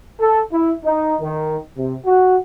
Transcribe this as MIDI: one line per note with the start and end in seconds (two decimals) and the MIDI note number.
0.19 0.39 69
0.51 0.71 64
0.84 1.14 63
1.20 1.57 51
1.76 1.95 48
2.05 2.37 66